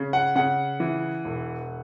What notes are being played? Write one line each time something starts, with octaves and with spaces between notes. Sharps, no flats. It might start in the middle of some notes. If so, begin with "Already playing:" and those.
Already playing: C#3
F#5
C#3 F#5
E3
E1